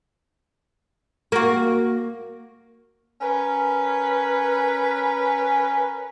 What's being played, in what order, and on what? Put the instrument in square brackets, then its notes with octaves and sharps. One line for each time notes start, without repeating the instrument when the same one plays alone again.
[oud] A#3 F#4
[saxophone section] C#4 A#4 B4